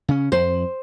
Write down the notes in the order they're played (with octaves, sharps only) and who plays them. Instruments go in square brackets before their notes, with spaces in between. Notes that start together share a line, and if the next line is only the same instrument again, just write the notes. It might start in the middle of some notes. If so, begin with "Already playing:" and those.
[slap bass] C#3 C#4
[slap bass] F2 [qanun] C5